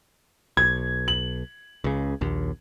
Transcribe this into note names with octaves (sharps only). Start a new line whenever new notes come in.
B1 G#6
F#7
C#2 C#3
A#1 D#2